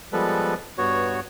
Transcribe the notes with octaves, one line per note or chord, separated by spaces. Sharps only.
F3 G3 G#3 B3 A4 B4
G2 B3 F#4 C#5